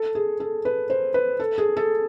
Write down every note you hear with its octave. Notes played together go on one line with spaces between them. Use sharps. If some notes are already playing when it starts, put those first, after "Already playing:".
Already playing: A4
G#4
A4
B4
C5
B4
A4
G#4
A4